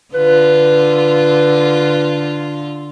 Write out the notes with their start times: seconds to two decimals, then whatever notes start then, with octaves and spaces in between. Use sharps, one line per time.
0.14 D3 F4 B4